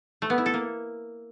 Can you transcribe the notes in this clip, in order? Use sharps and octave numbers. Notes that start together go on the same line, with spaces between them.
A3
B3
E4
A4
A#3